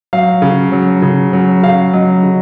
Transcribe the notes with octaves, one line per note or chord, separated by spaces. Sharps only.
F#3 F5
C#3
F#3
C#3
F#3
C#3 F5
F#3 D#5
C#3